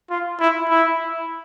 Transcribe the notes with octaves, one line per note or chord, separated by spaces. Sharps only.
F4
E4
E4